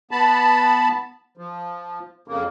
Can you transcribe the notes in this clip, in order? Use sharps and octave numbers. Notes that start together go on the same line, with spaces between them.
B3 A5 B5
F3
F2 C#3 A#3